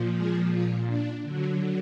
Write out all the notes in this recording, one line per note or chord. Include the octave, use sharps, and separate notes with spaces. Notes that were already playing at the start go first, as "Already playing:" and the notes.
Already playing: A#2 F3
G#3 G#4
F3 F4
D4
D3 F#3